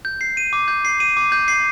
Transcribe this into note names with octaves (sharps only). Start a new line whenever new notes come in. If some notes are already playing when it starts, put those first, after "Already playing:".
G6
C7
D#7
D6
G6
C7
D#7
D6
G6
C7